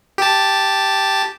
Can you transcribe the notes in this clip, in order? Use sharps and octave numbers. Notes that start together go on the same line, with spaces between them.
G4 A5